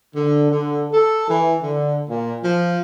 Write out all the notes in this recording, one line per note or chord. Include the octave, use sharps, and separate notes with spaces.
D3
D3
A4
E3
D3
A#2
F3